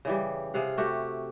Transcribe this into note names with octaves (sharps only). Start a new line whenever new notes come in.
C#3 E3 G3
C3 G#4 F5 F#5
A3 F#4 G4